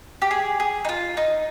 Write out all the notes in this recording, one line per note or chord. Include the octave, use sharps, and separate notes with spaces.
G4
G#4
G#4
D#4
F4
D#4